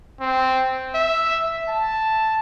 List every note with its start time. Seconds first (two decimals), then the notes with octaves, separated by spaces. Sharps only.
0.20 C4
0.95 E5
1.68 A5